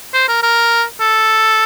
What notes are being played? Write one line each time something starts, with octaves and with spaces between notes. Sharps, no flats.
C5
A#4
A#4
A4